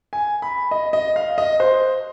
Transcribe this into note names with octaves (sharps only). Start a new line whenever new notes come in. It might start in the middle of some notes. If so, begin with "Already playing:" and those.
G#5
B5
D#5
D#5
F5
D#5
C5